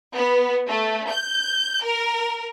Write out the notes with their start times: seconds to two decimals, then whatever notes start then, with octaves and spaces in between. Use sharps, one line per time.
0.14 B3
0.68 A3
1.10 G6
1.84 A#4